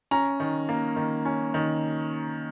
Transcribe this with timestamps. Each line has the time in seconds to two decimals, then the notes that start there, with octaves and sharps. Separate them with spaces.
0.11 C#4 A#5
0.40 D#3
0.69 A#3
0.96 D#3
1.25 C#4
1.54 D#3